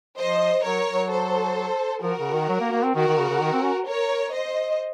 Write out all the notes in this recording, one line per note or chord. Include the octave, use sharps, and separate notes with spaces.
F3 C5 D#5
F#3 A#4 C#5
F#3
A4 C5
F3 F#4 A#4
C#3
D#3
F#3
A#3
A#3
C4
D#3 F#4 A#4
D#3
C#3
C#3
D#3
C4
C#4
A#4 C#5
C5 D#5